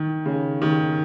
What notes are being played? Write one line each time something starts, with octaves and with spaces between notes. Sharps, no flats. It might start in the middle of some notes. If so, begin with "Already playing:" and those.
Already playing: D#3
C#3
D#3